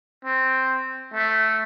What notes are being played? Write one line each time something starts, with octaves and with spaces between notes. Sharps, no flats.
C4
A3